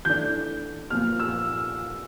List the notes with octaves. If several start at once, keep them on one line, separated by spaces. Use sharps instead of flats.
E3 A3 D4 G6
A#2 F3 A#3 F6
E6